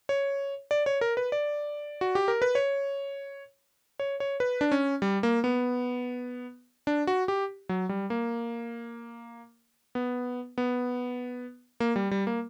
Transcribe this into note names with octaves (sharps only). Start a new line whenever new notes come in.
C#5
D5
C#5
A#4
B4
D5
F#4
G4
A#4
B4
C#5
C#5
C#5
B4
D4
C#4
G3
A#3
B3
D4
F#4
G4
F#3
G3
A#3
B3
B3
A#3
G3
G3
A#3